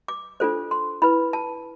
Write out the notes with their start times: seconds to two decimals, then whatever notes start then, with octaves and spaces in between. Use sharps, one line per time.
0.08 D6
0.40 D4 F4 A4 C5
0.71 C6
1.02 E4 B4 B5
1.33 A5